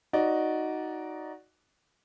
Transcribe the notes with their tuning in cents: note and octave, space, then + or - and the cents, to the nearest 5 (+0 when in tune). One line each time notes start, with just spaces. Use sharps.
D#4 +5 F#4 +0 D5 -10